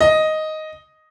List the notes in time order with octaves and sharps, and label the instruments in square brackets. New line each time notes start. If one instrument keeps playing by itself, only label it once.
[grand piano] D#5